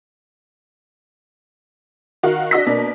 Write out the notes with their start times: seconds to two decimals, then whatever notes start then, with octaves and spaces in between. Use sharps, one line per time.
2.23 D#3 F#4 F5
2.51 D4 F#4 D#5 E6 A#6 B6
2.66 B2 A#3 D4